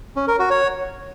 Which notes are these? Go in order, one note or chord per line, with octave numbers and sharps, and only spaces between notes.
C#4
A#4
F#4
C#5